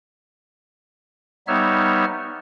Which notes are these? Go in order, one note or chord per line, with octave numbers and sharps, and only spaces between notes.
G3 B3 D#4 C#5 E5 F6